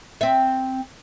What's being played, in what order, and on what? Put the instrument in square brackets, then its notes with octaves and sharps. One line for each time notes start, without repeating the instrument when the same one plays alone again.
[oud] C4 E5